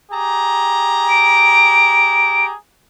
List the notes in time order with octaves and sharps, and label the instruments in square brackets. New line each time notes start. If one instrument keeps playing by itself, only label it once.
[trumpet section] G4 G#4 A#5
[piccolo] D7